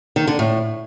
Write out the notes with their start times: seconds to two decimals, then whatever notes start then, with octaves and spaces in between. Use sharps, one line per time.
0.16 D#3
0.27 D3
0.39 A2